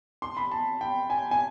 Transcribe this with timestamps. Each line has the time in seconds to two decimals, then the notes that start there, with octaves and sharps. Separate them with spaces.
0.22 C6
0.37 B5
0.51 A5
0.81 G5
1.10 G#5
1.31 G#5